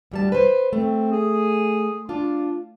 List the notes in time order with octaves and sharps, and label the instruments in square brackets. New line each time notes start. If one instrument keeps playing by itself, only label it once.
[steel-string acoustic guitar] D2 G3 A5
B4 C5
[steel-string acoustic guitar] A3 [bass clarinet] C4
[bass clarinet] G#4
[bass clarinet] D4 [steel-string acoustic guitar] F4